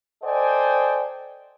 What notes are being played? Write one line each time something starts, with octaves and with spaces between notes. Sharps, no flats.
A4 C5 D5 D#5 G5 G#5